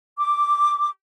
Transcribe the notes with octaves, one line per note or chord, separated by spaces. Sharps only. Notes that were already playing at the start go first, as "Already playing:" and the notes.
D6